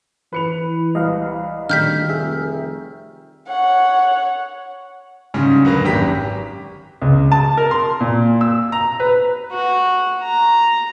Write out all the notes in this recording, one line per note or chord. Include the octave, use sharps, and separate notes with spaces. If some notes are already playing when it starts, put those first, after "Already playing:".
E3 B4 C#7 F7
C2 B4 D#5 F5
D2 D#3 G3 F6 G6 B6
F1 G#4 E5
C#5 F#5
G#2 C#3 G3 C#4
D2 F#3 A#3 B4 A#6
G#1 F#2 G4 A#5 B6
C#2
A5
A#4
C6
A#2
E6
A#5
B4
F#4
A#5